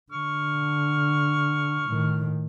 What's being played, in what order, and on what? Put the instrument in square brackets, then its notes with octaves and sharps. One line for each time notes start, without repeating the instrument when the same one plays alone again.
[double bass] D3 [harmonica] C#6 F6
[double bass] A2 D#3